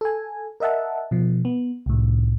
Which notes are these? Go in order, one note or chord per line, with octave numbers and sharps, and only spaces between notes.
A4 G#5
A#4 D#5 E5 F#5 A5
B2 F3
B3
C2 A2